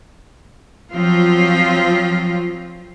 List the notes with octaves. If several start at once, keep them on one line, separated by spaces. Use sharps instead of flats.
F3 F#3 C4 F4